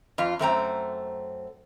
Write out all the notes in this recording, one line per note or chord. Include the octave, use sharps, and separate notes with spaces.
F2 F4
F#2 A3 C4 A#5